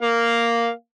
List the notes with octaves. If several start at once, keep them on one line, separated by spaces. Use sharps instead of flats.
A#3 F5